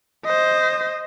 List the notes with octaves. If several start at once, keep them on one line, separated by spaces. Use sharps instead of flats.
C5 D#5